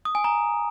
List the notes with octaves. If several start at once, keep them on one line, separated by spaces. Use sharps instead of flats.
D#6
G#5
A#5